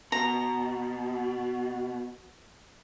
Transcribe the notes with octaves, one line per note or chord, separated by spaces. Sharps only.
B2 A#5